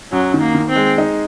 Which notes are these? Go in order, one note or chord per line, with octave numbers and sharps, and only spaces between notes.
F#2 F#3
D#3
A#3
D#3
C4
G#3
D#4